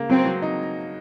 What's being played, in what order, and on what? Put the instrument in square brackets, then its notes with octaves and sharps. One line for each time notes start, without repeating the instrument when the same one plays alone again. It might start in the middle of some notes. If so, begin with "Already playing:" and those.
Already playing: [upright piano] C#3 A#3
[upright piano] F#3 [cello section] C4
[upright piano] F#3
D#4